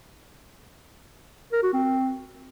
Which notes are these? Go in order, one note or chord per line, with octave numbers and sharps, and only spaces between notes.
A#4
F#4
C4